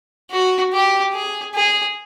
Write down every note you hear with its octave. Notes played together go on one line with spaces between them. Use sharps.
F#4
G4
G#4
G#4